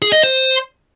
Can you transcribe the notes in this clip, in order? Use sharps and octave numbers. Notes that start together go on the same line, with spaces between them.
G#4
D#5
C5